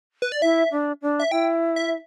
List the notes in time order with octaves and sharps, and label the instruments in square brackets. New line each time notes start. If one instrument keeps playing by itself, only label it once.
[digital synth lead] B4
D5
[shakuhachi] E4 [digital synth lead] E5
[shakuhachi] D4
D4
[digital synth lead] E5
[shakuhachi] E4 [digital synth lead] G5
[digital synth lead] E5